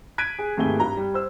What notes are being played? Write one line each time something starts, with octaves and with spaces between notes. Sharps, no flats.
F#6 G#6 B6 D7 D#7
G#4
G#1 D#2 A3 G#4 G7
G2 A#5
G3
C5 E6